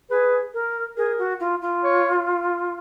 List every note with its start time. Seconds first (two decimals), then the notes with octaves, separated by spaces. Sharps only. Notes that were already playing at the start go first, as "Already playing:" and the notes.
0.10 G#4 B4
0.54 A#4
0.97 G#4 A#4
1.18 F#4
1.40 F4
1.62 F4
1.84 C#5